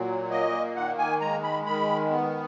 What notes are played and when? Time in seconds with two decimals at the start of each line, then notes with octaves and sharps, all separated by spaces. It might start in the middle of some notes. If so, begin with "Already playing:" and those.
Already playing: A#2 F#3
0.31 A#3 D#5
0.76 D#3 F#5
0.98 G#5
1.20 G#3 A#5
1.43 B5
1.66 D#3 B5
2.10 B3